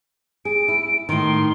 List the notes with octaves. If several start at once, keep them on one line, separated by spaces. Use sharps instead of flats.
G#4 D7
E4
A2 D#3 C6